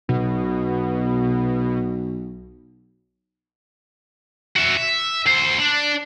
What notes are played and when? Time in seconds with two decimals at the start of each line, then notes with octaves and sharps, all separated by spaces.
0.09 B1 B2
4.56 F#4 E5
4.77 E5
5.26 D2 C5
5.58 D4